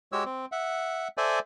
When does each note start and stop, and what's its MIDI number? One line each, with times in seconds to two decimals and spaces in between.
0.12 0.24 56
0.12 0.24 66
0.12 0.24 67
0.12 0.24 73
0.12 0.24 88
0.25 0.46 60
0.52 1.08 76
0.52 1.08 78
1.18 1.39 69
1.18 1.39 72
1.18 1.39 74
1.18 1.39 76
1.18 1.39 80